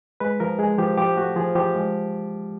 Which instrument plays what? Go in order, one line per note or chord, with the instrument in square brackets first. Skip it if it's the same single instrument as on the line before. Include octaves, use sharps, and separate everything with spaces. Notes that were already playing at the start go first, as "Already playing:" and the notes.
[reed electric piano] G#3 B4
F3 A#4
G#3 G#4
F3 G4
F3 G4
A3 F#4
F3 G#4
F3 G4
G#3